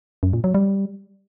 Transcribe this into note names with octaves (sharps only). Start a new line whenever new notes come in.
F#2
A#2
F#3
G3